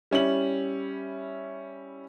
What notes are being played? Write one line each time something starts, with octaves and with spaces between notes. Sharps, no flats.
G3 C#4 E4 F#7